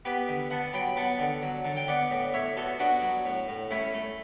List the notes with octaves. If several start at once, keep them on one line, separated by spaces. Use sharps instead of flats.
B3 G4 B4
D3
B3 F#5 A5
F#3 G5 B5
B3 F#5 A5
D3
F#3
D3 A5
G5
B3 D5 F#5
A2
A2 C#5 E5
B3 F#4 A4
B3 D4 F#4
F#3
A2
A2
A3 C#4 E4
A3